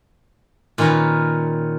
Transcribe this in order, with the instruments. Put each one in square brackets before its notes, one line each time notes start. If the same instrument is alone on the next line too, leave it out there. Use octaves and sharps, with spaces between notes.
[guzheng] A#2 D#3 C#4 A#4 B4